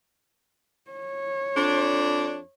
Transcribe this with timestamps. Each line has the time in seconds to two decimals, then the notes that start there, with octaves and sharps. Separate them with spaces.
0.91 C#5
1.56 F2 D4